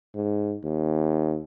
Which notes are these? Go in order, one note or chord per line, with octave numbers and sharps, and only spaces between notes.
G#2
D#2